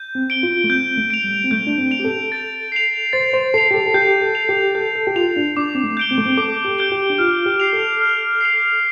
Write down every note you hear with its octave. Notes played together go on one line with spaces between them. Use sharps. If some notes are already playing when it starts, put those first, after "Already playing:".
Already playing: G6
C4
D7 G7
F4
A3
C4 G6
A3
D7 F7
G3
C4
A3 G6
D4
C4
D7 F7
G4
A4
A6
C7 F7
C5 A6
C5
A4 C7 F7
G4
A4
A4
G4 G6
A4
F7
G4
A4 G6
A4
G4
F4 F7
D4
D4 D6
C4
A3
G6 D7 G7
C4
A3
C4
A4 D6
G4
G6 D7 G7
G4
D4
F4 F6
G4
C7 F7
A4
F6
C7 F7